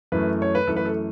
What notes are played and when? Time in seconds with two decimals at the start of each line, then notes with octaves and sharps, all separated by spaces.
0.12 F#2 E3 A3 B4
0.42 C#5
0.55 B4
0.67 F#2 E3 A3 A4
0.76 B4
0.85 A4